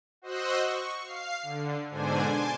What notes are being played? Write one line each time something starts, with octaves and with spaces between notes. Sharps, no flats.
F#4 C5 D#5 E6 F#6
C#6
F5 C7
D3
G#2 B2 D3 D4 C5 G#5
G#5 A5 C6 D6